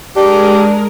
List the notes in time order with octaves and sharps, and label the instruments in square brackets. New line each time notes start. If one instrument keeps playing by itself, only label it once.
[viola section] G#3 A#4 [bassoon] D4 [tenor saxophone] G4